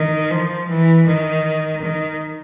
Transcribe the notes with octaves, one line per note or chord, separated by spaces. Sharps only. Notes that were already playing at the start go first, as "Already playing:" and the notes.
Already playing: D#3
F3
E3
D#3
D#3